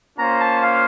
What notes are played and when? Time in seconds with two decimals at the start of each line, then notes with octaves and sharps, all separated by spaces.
0.18 A#3 C#4 F4 C5 A#5
0.40 A5
0.63 F5